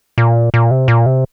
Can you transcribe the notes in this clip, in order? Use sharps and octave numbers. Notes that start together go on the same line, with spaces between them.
A#2
A#2
C3
A#2
C3